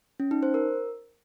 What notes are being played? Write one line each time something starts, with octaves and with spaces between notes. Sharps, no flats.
C#4
D#4
C5
A#4